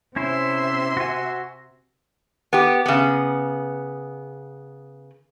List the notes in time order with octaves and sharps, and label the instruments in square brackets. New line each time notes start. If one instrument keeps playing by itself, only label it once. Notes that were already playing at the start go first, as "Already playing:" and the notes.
[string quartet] C3 E5 C6 [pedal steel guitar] C#4 E4 C5
[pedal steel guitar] F#4 G#5
[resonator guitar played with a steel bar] B3 G4
C#3 B3